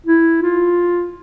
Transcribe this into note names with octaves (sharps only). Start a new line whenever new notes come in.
E4
F4